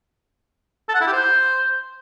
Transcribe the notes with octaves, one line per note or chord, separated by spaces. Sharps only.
A4
F#5
E4
G4
C5